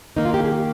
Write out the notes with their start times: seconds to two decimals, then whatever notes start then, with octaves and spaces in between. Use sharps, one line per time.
0.16 D#3 A#3 D#4
0.25 F4
0.34 G4
0.44 G#4
0.52 G4